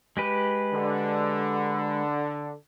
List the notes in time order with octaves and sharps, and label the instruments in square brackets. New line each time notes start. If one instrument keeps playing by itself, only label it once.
[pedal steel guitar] G#3 G4 B4
[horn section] D3